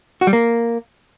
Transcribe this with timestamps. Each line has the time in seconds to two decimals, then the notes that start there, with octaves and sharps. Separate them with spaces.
0.21 F#4
0.27 G3
0.33 A#3